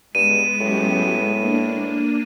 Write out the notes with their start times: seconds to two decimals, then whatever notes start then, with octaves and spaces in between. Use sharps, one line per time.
0.15 G2 G#3 B3 D#7 E7
0.60 A2 F#3 C#4 G4
1.37 A#3 D4